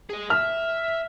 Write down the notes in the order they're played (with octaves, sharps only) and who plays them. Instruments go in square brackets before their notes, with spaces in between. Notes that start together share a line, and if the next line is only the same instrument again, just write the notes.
[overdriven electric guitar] G#4 D#5
[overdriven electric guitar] E5 [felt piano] F6